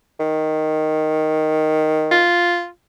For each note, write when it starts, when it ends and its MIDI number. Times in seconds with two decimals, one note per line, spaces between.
0.20 2.25 51
2.11 2.68 65